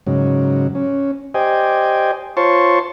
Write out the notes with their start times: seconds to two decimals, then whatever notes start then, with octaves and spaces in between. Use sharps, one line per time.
0.07 G#2 C#3 F#3
0.75 C#4
1.34 G4 C5 D5 D#5 G5 G#5
2.37 F4 C5 C#5 A5 C6 C#6